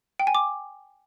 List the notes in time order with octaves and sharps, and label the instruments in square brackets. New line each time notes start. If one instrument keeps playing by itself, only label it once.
[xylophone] G5
G#5
D6